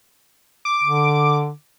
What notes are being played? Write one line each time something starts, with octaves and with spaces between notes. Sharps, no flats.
D6
D3